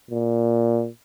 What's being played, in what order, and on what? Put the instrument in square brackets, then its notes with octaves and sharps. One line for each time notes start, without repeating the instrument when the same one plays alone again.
[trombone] A#2